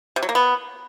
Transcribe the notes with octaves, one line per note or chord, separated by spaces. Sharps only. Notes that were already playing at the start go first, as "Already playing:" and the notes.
C3
F#3
A#3
B3